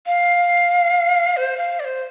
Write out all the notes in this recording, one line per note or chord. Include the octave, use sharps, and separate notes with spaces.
F5
C5
F5
D5
C5